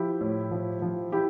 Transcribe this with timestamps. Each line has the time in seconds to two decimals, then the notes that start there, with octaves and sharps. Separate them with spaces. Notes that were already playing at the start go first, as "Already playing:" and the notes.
Already playing: F3 E4 G4
0.21 A2
0.51 F3
0.82 F3
1.12 F3 E4 G4